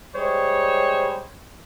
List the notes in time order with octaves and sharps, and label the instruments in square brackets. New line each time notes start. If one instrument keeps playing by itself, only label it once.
[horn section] G3 G#3 C5 C#5